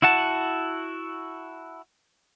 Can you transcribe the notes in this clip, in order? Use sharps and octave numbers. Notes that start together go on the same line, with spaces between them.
E4 F#4 F#5 A5